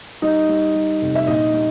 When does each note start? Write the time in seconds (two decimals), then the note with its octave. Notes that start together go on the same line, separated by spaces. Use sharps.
0.22 G3 D#4 D#5
0.49 G3
0.75 G3
1.01 F1
1.15 E5
1.27 A#1 D#4 D#5
1.53 G3